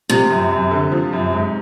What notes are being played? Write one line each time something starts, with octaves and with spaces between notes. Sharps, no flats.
C3 F3
F#2
F#2
D3
F3
F#2
G#2